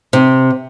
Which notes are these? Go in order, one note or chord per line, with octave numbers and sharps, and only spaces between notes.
C3